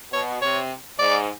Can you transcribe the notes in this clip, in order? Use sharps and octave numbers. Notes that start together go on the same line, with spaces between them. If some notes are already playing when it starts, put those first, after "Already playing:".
B2 C#5
C3 C#5
G#2 D5